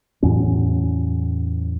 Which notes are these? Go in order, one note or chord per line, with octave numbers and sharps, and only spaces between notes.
E2 A2 F#3 C#4